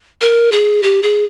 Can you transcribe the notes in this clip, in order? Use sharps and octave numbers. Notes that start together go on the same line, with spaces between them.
A#4
G#4
G4
G#4